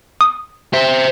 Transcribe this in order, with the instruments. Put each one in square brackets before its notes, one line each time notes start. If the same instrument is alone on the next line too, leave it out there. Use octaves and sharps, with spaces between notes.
[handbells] D#6
[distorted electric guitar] C5 E5